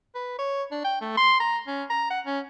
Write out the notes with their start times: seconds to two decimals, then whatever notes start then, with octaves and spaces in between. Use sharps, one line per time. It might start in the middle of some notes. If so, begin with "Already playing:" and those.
0.15 B4
0.39 C#5
0.71 D4
0.85 G5
1.02 A3
1.17 C6
1.40 A#5
1.67 C#4
1.90 A#5
2.11 F#5
2.26 C#4